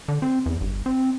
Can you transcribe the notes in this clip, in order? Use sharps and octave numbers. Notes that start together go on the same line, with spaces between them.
D3
C4
E2
G1
C4